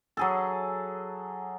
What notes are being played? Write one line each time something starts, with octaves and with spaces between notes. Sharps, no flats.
F#3 G#4 A4